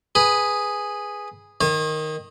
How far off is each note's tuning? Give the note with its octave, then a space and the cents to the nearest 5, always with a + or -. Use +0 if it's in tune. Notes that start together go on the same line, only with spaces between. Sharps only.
G#4 -5 B4 +0
D#3 +0 C#5 -45